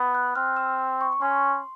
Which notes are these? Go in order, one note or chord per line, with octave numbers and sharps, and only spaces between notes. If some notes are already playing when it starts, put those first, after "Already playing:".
Already playing: B3
F#6
C4 F6
E6
C#6
C#6
C#4 C6